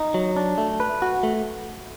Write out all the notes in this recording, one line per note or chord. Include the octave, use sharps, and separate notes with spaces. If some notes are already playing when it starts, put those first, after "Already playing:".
Already playing: D#4
F#3
D4
A3
B4
F#4
A3